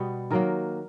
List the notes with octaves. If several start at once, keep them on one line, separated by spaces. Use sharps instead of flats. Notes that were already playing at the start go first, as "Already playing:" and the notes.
Already playing: B2 G3 B3
D#3 F#3 A#3 A#4